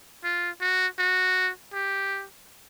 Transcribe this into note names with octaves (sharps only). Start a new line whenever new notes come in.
F4
F#4
F#4
G4